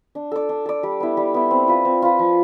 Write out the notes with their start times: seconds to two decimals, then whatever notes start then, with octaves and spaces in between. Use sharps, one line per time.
0.15 D4
0.31 A4 D5
0.49 D4
0.66 A4 D5
0.83 G3
1.00 B3 E4
1.17 G3
1.34 B3 E4
1.51 C4
1.68 F4 B4
1.85 C4
2.02 F4 B4
2.19 F3